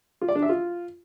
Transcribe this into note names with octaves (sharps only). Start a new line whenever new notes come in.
F4
D5
D4
E5
F4